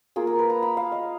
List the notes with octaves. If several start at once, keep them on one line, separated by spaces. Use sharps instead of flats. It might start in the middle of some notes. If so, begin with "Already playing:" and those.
A#3 F4 G#4
A#4
B4
A#5
B5
F5
D#5